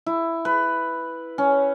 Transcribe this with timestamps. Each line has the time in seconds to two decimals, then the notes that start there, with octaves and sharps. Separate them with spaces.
0.06 E4
0.45 B4
1.38 C#4